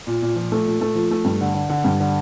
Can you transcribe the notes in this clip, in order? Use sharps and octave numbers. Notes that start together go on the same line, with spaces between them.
A#2
A#2
F3
A3
A#2
A3
F3
A3
G2
D3
D3
D3
G2
D3